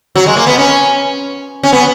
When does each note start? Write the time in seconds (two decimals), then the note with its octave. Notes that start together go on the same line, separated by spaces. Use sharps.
0.16 F#3
0.26 G#3
0.37 A#3
0.47 B3
0.58 C#4
1.63 C#4
1.73 B3